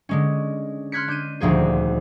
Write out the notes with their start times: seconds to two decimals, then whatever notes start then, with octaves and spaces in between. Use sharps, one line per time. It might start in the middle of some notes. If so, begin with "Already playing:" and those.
0.09 D3 G#3 C#4
0.92 C6 F6 F#6 G#6 B6 C#7
1.08 D4 G6 D#7
1.40 D#1 D2 F3 G#4 C5